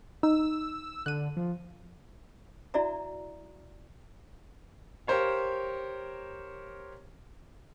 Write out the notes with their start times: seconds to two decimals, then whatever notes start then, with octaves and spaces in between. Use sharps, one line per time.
0.23 D#4 E6
1.06 D3 F#6 D#7
1.37 F3
2.74 E4 F#4 D5 E5 A#5
5.07 G4 A#4 C5 C#5 F5